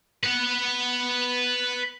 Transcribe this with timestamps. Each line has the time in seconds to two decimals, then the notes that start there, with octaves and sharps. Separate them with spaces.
0.24 B4 F#5